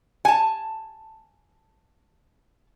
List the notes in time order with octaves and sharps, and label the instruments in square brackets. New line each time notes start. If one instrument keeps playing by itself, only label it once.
[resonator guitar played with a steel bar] G#5 A5